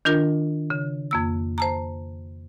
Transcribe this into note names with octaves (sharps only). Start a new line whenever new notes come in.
D#3 D4 F4 A#4
C#3
F2 A#3 E6
C5 A5 A#5